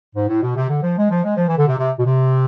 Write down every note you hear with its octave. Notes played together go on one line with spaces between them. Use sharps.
G#2
A2
B2
C3
D3
F3
G#3
F3
G#3
F3
E3
D3
C3
C3
B2
C3